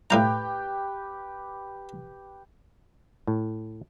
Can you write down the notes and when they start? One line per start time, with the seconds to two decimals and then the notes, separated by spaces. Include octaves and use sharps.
0.10 A2 G4 B4 F5 G5 A#5
3.27 A2